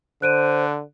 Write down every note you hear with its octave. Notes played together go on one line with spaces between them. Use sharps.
D3 C5 F#6 D7 D#7